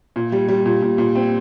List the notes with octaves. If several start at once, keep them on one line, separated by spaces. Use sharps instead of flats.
A#2
G3
G3
A#2
A#2
A#2
C4